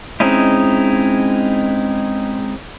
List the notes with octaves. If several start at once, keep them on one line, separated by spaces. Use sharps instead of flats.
G#3 C4 C#4 D#4 E4